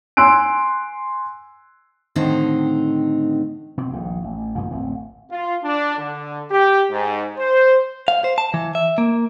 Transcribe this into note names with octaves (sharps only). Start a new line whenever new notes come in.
G#5 C6 E6 F#6 D7
A2 D3 D#3 C4 D#4
B2 C4
D#1 A#1 G#2
A1
F#2 A#2 D#3
D1 A1 C4
F4
D4
D3
G4
G#2
C5
F5
C5
A5
E3
E5
A#3